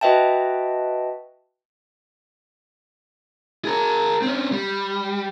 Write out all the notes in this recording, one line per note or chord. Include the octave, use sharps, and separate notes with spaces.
F#4 B4 D#5 E5 G5 A5
G#4 A#4
C4 C#4
G3